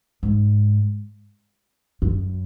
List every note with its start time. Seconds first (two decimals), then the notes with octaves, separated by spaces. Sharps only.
0.23 G#2
2.02 F#2